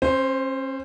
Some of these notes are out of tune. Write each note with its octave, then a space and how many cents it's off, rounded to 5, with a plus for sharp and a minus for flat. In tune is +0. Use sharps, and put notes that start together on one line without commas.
C#4 -40 C5 +0